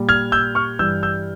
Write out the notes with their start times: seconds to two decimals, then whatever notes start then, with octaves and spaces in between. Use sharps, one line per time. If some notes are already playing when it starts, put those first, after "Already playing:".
Already playing: A#2 G3
0.09 F6 G#6
0.32 E6 G6
0.55 C#6 F6
0.79 G2 E3 G3 E6 G6
1.03 E6 G6